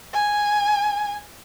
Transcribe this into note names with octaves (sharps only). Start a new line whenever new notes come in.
G#5